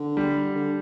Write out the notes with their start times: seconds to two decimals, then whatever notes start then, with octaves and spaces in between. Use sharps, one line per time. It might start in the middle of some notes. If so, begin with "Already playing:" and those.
Already playing: D3
0.17 G3
0.56 D3